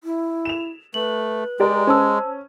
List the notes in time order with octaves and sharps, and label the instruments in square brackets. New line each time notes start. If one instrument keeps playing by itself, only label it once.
[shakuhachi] E4
[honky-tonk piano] E7 F7
[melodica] A3 [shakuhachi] B4 [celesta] F#7
[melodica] G#3 [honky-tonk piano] G4 A#4 D5
[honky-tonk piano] C#4 [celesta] C5 A5 E6